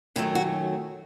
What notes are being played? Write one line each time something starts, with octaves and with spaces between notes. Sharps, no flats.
F#2 D#3 F#3 A3 E4
F#4